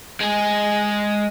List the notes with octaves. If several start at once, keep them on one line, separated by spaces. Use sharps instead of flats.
G#3 G#4